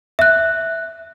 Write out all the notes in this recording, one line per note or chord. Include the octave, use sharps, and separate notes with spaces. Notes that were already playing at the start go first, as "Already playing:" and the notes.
E5 F#6